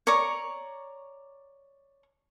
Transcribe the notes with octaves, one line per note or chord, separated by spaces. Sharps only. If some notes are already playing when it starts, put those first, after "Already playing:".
C#5 D5 A#5 C#6